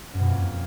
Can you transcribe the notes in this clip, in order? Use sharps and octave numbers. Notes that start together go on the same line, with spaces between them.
F#2
B2
F2
A#3